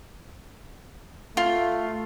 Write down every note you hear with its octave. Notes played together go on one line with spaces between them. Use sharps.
A3 F4